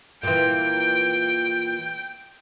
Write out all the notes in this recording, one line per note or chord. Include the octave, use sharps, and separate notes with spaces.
A#2 E3 G5